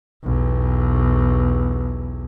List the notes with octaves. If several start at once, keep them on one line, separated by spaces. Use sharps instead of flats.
B1 E2